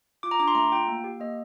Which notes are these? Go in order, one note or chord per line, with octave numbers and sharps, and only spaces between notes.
F4 D6
A#5
D4 D6
C6
A3 A#5
F4 G5
A#3
G4
A#3 D#5